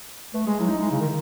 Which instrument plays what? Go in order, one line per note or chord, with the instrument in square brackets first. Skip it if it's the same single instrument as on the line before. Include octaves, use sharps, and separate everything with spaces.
[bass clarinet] A3 [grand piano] B4
[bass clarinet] G#3 [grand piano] G#4
[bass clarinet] F#3 [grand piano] E4
[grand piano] D#4
[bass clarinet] G#3 [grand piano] E4
[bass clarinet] C#3
D#3